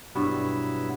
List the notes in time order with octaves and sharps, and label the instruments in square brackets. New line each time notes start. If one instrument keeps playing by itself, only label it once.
[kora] G2 G3 [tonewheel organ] B2 F#3 B3 E4